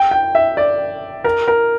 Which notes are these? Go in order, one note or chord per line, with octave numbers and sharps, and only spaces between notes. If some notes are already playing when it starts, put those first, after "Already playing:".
Already playing: G5
G5
E5
D5
A#4
A#4